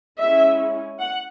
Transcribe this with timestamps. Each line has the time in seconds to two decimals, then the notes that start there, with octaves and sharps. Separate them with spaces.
0.19 G#3 C#4 E4 E5
0.99 F#5